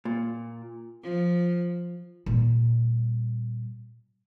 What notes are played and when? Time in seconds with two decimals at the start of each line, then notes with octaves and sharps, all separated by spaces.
0.05 A#2
1.03 F3
2.26 A#2 G3